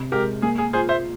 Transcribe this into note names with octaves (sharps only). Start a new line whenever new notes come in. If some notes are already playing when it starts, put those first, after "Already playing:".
Already playing: C3
G#3 G4 A#4
A#3 G#4
G#4
F4 G#4 C5
C5 E5